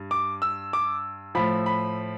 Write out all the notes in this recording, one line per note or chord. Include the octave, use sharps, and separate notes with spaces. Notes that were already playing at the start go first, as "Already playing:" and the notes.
Already playing: G2
D6
E6
D6
A2 F3 B5
B5